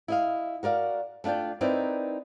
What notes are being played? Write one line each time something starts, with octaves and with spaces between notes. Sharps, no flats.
E4 D#5 F5
F#4 A#4 D5 F5
A3 D4 F4 D5 G5
C4 D#4 E4 A#4 B4 D5